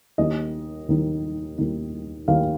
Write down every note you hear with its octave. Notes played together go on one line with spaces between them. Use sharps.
D#2 D#3 D#5
D#2 D#3
D#2 D#3
D#2 D#3 F5